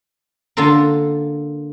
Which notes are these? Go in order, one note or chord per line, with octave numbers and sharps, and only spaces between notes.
D3 A#3 F4 A4 A#4